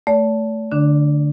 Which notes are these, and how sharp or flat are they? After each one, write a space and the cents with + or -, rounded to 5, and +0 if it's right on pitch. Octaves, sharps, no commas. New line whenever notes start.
A3 +0 D5 -45
D3 +0 D4 +0